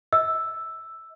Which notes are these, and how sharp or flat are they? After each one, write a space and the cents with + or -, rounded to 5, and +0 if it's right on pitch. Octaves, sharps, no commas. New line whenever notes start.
D#5 +45 E6 +0